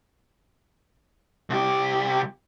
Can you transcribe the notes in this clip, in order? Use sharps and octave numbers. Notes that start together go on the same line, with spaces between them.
C2 G4